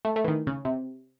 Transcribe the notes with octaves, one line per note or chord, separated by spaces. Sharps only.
A3
A3
E3
D#3
C#3
C3